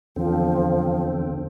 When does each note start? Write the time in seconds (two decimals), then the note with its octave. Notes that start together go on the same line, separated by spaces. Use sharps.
0.16 E2 D3 F3 C4